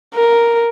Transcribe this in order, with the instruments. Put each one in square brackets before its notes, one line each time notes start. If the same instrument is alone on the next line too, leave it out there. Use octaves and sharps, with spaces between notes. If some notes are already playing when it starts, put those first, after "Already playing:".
[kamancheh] A#4